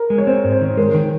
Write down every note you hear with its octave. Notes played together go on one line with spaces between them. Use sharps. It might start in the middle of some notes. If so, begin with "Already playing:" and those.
Already playing: A#4
G#3
C#5
C4 C5
G#2
C5
D#3
G#3 A#4
D#3